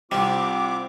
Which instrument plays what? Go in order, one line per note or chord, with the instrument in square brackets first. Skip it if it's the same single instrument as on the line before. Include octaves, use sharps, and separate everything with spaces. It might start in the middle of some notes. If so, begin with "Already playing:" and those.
[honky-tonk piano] C2 C3 [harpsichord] G3 [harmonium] C4 F4 [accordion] D6